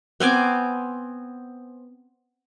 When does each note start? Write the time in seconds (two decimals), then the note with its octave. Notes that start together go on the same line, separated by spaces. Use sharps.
0.20 B3 C4 G#5 D6